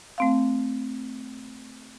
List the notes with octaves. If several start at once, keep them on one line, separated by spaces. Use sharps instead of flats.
A3 C4 F5